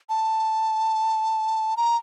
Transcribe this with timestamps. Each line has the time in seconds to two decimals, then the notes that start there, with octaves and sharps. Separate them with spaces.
0.09 A5
1.77 A#5